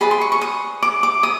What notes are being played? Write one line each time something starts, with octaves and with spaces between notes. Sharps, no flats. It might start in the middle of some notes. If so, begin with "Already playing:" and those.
G#4 B4 D5 B5
C6
C#6
C#6
D#6
D6
D6
D#6